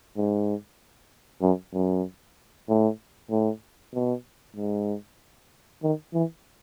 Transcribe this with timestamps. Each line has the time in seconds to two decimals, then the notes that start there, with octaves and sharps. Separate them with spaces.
0.17 G#2
1.42 F#2
1.74 F#2
2.69 A2
3.31 A2
3.94 B2
4.56 G#2
5.83 D#3
6.14 E3